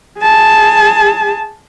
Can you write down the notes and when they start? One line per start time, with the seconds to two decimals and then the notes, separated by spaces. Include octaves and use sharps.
0.19 G#4 A5